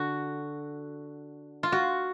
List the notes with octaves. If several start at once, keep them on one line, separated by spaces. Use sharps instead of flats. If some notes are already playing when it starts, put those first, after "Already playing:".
Already playing: D3 F#4
F4
F#4